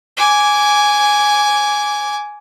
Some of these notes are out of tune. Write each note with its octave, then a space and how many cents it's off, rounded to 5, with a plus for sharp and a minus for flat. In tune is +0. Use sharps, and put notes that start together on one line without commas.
G#5 +0 D6 -20